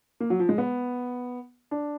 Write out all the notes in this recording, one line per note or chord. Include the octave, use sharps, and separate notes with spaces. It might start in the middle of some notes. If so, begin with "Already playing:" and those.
A#3
F#3
F3
G#3
B3
D4